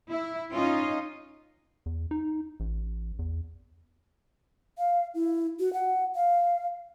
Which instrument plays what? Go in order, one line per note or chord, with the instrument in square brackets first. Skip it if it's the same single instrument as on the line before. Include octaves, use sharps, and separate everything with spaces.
[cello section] E4
C#4 D#4 F4 D#5
[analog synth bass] E2
D#4
A1
E2
[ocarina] F5
E4
F#4
F#5
F5